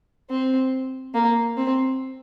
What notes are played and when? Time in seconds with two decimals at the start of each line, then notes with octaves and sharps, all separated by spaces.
0.30 C4
1.14 A#3
1.57 C4